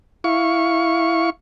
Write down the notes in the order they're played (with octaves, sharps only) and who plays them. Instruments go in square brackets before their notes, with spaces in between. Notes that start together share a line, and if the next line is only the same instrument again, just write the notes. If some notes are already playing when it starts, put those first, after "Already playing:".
[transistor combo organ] E4 F5 C#6